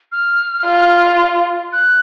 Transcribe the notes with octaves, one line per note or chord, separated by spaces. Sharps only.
F6
F4
F#6